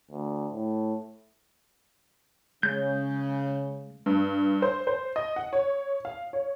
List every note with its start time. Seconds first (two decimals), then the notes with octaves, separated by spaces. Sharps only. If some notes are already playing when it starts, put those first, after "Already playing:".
0.11 D2
0.52 A2
2.63 C#3 G#3 G6
4.06 G2
4.62 C5
4.87 C5
5.16 D#5
5.36 F#5
5.53 C#5
6.05 F5
6.33 C#5